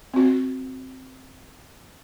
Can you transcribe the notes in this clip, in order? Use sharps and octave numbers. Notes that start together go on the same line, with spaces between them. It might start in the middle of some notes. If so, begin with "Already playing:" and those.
C4 F#4